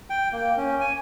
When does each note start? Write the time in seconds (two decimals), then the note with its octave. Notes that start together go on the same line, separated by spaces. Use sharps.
0.10 G5
0.32 A#3
0.57 C#4
0.81 G#5